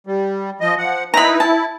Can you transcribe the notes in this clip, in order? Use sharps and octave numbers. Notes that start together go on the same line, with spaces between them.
G3
F3 D#5
F3 F#5
D#4 E4 B4 A#5 B5
E4 A5